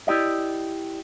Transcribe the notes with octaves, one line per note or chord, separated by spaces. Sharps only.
E4 G4 D5 D#5